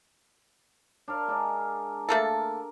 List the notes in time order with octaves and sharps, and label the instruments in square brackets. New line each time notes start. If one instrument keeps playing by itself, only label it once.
[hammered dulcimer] D4 A#4 F5
G#3 D4 A#4
[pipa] A3 A#3 A4 [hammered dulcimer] A#4